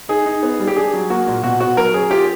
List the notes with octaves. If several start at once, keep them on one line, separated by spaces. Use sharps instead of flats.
D#4 G#4
D#4
B3
G3
G4
D4 G#4
F#3
A#3 F#4
A#2
B2 F#4
B3 F#4
F#3 A#4
C#4 G#4
F4 G4